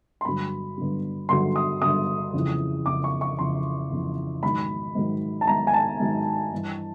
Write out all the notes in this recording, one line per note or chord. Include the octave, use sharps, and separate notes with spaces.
C6
G2 D3 F#3 B5
G2 D3 F#3
G2 D3 F#3 C6
D#6
G2 D3 F#3 D#6
F2 C#3 E3
F2 C#3 E3 D6
C#6
C#6
F2 C#3 E3 C6
F2 C#3 E3
G#2 D#3 F#3 B5
G#2 D#3 F#3
A5
G#2 D#3 F#3 A#5
G#5
A5
G#2 D#3 F#3
G2 E3